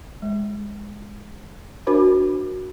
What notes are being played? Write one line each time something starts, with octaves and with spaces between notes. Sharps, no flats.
G#3
D4 F#4 A#4 C5 B5 D6